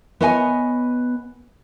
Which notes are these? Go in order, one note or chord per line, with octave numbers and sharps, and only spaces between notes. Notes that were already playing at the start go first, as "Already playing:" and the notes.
B3 B4 C#5 D#5 F5 G#5